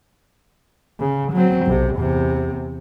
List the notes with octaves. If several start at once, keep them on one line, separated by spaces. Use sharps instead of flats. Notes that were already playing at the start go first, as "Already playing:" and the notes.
C#3
F#3 C4
B1 C3
E2 C3